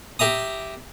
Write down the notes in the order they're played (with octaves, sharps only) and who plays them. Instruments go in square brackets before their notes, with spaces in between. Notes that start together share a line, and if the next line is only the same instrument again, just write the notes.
[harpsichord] G4 E5 A#5 D#6